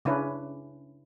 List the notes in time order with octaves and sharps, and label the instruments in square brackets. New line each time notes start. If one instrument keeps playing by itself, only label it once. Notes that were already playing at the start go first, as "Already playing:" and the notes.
[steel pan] C#3 C#4 D4 E4 B4